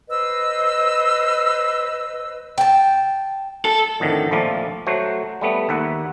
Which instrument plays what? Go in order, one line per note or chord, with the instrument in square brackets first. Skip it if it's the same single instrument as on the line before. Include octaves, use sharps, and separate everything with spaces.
[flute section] B4 C5 D#5 E6
[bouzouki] G5 A5
[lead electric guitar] A4
[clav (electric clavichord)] F2 A2 D3 D#3
A#1 F3 A3 F4 D5
F#3 A3 F#4 C5
G3 A3 B3
D#2 E5 F#5